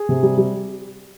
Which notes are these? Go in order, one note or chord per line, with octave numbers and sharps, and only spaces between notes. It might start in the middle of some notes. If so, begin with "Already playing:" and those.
Already playing: G#4
C3
G3
G3